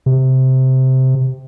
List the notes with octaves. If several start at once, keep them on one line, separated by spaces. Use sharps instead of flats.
C3